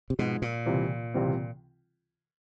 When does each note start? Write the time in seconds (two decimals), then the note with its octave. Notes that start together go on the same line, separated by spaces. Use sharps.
0.10 C3
0.19 G#2 B2 F3 G#3
0.42 A#2
0.66 C#2 C3 E3 G3 C4
1.14 C#2 C3 E3 G3 C4